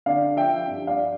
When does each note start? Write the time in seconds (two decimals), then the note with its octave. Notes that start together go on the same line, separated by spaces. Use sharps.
0.06 D3 D5 F5
0.36 F3 E5 G5
0.68 G2
0.87 D5 F5